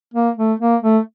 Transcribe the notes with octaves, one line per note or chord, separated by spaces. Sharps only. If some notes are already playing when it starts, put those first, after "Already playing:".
A#3
A3
A#3
A3